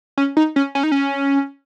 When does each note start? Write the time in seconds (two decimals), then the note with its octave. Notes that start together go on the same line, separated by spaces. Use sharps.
0.17 C#4
0.37 D#4
0.56 C#4
0.75 C#4
0.83 D#4
0.92 C#4